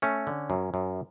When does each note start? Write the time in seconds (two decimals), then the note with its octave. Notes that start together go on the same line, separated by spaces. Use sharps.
0.02 A3 C#4
0.27 D3
0.50 F#2
0.74 F#2